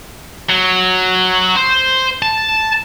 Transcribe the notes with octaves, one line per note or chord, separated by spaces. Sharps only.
F#3
C5
A5